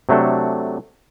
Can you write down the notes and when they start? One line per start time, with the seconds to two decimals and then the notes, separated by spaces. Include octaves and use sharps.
0.09 C3 F#3 A3 D4 A4